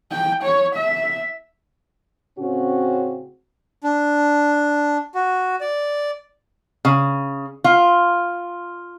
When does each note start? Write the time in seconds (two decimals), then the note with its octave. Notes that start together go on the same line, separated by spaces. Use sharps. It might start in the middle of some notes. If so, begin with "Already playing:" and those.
0.12 G5
0.44 C#5
0.75 E5
2.38 A2 C#3 C4 C#4 F#4
3.84 D4
5.15 F#4
5.60 D5
6.85 C#3
7.64 F4